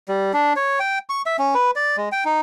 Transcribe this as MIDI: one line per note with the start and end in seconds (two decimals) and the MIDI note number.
0.09 0.32 55
0.34 0.53 62
0.56 0.79 73
0.80 0.99 79
1.10 1.22 85
1.26 1.37 76
1.39 1.54 61
1.55 1.71 71
1.76 1.96 74
1.97 2.09 56
2.12 2.24 79
2.25 2.41 63